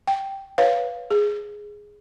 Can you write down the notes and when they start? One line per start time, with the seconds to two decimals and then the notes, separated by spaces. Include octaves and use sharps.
0.07 G5
0.58 B4 C#5 F5
1.11 G#4